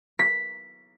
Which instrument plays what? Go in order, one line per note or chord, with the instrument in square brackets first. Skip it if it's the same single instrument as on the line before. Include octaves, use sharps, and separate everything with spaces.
[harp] B6